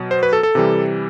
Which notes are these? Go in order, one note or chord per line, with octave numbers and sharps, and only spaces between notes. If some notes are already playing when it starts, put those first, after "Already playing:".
Already playing: B2 F#3
C5
B4
A4
A4
C3 E3 G3